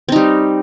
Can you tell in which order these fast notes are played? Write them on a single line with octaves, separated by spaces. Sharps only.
C4 D#4 G3